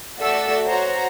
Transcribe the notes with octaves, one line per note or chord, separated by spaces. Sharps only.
A3 F#4 A4 D5 E5 E6
F#4 C5 C#5 A#5